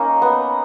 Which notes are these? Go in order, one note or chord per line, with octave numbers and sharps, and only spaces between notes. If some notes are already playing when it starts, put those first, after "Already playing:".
Already playing: A#3 C#4 D#4
B3